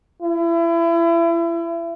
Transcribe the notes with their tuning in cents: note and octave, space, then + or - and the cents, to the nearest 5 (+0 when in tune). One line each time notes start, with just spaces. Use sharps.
E4 +30